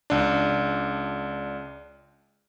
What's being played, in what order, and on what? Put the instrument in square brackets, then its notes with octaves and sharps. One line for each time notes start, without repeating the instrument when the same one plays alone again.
[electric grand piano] C#2 D4